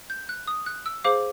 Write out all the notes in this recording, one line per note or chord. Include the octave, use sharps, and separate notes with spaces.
G6
F#6
D#6
F#6
E6
G#4 C5 F5 D6